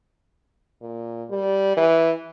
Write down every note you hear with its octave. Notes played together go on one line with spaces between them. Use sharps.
A#2
G3
E3